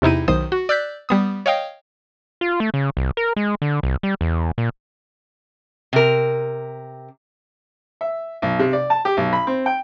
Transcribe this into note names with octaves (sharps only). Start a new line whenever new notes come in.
E2 C3 D#4 E4 D#7
B1 D#3 C5 D#6
F#4
D5 E6 F#6 G6 B6
G3 B3 D#6
C#5 D#5 F5 G5 D#6
F4
A3
C#3
C2
A#4
G#3
D3
C2
G3
E2
A#2
C3 A#4
E5
B1
C3
D5
A5
G4
B1
B5
C4
G5